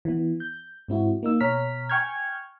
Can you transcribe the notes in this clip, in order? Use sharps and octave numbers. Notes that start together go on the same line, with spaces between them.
E3 B3
G6
G#2 C4 E4 F#4
A#3 D#4 E6
B2 C#5 A#5 F6 B6
G5 G#5 C#6 F6 G6 G#6